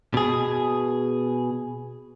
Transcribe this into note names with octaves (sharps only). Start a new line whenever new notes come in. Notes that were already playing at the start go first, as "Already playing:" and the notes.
B2 G#4